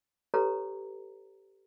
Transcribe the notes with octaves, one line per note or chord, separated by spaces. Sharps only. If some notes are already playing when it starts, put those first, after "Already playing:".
G4 A4 B4 C#5 A#5